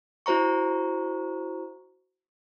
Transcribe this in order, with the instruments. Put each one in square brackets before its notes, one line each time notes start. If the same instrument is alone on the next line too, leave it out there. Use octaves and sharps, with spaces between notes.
[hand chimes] E4 F#4 C5 A#5 C#6